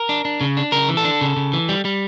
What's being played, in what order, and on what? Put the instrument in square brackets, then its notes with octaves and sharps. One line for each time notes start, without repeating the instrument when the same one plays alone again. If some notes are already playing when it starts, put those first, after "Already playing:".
Already playing: [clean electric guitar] A#4
D4
D4
C#3
D4
C#3 A#4
E3
A4
D4
C#3
C#3
E3
G3
G3